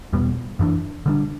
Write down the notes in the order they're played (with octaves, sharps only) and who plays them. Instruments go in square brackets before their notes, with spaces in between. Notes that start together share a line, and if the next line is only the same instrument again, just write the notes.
[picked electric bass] E2 B2 G3 B3
F#2 E3 B3 D4
D3 G3 D4